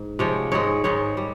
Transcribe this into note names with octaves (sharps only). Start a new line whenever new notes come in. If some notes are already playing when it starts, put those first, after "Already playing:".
Already playing: G#2
C3 F3 G#3 C#5
G#2 D#3 G#3 C#5
G#2 D#3 G#3 C#5
G3